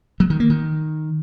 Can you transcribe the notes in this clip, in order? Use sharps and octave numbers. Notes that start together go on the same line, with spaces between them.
F#3
D#3
A#3
D#3